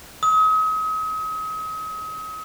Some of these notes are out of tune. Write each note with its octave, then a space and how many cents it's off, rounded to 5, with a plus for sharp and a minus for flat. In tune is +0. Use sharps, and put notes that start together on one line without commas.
D#6 +40